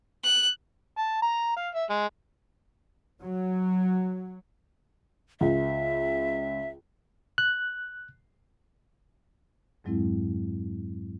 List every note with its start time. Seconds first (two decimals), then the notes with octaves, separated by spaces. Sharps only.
0.24 F#6
0.97 A5
1.22 A#5
1.57 F5
1.75 E5
1.90 G#3
3.22 F#3
5.41 C#2 E5
7.38 F#6
9.84 F2 G#2 F#3 G#3 C4 E4